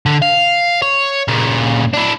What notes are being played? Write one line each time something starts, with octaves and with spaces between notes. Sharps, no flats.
D3
F5
C#5
A#2 C#3
D4 E4